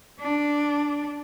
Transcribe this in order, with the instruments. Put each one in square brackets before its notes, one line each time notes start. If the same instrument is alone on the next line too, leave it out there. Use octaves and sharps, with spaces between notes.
[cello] D4